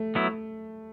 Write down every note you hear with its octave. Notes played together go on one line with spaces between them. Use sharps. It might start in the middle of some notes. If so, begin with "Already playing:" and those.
Already playing: A3
F#3 B3 E4